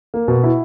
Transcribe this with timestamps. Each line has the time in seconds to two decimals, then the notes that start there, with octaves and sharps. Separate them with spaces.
0.14 A#3
0.28 B2
0.44 E4